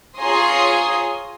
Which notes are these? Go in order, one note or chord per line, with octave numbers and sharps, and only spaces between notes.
F4 G#4 C#5 A#5 C6 D#6